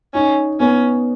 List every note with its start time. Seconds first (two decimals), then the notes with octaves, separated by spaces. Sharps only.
0.14 C#4 D#4
0.60 B3 C#4